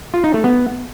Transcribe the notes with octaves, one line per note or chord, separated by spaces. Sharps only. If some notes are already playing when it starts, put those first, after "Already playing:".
F4
D#4
A3
B3